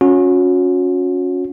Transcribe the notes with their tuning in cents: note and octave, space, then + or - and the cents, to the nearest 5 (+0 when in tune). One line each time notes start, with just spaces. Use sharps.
C#4 +0 F#4 -35